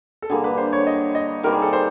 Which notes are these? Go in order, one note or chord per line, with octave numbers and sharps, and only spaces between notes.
A4
D3 G3 A#3 G#4
B4
C5
C#5
D#5
D#5
D#3 G3 C4 A#4
G#4
A4
C5